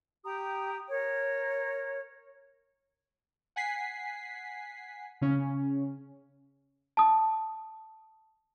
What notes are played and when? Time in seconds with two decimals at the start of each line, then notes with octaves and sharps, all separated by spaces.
0.24 G4 G5 A#5 D#6
0.88 A#4 C#5
3.56 F#5 G#5 B6 C7
5.21 C#3 C#4
6.97 A5 D#6